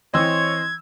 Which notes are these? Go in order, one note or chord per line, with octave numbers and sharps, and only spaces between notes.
E3 C4 C#5 D#5 C6 E6 G#6